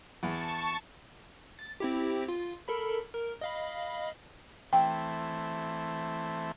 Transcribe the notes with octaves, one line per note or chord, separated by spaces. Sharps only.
E2 A5 C#6
A6
C4 E4 G4
F4
A4 A#4 B5
A#4
D#5 F5 B5
E3 A3 C4 G5